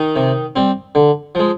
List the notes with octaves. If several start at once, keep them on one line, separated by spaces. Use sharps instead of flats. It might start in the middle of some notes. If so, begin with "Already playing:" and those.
Already playing: D#3 D#4
C3
G3 C4
D3
F3 G#3